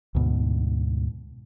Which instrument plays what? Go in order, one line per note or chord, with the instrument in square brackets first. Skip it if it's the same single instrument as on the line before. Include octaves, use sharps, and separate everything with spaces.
[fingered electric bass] D2 G#2 B2